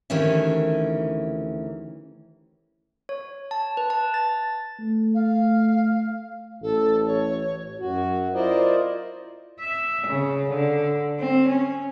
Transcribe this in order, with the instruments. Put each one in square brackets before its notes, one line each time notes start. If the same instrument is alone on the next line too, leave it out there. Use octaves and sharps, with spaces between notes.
[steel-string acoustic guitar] D2 D#3 E3 C#4 G4 E5
[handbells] C#5
A5
B4
A5
A6
[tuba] A3
[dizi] F5
[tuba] A1 [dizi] A4
[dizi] C#5
[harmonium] F#2 F#4
E4 F4 A#4 C5 D5 D#5
[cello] E5
C#3
D3
C4
C#4